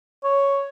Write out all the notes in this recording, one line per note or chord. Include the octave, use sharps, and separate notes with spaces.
C#5